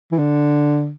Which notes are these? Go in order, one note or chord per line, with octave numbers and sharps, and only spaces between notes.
E3
D3